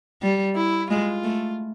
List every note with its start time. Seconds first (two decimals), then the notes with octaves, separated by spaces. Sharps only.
0.22 G3
0.56 E4
0.90 G#3 F4
1.24 A3